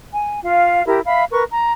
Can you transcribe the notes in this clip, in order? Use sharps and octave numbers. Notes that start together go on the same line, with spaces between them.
G#5
F4 F5
E4 G4 A#4
E5 F5 B5
A#4 B4 C#6
A#5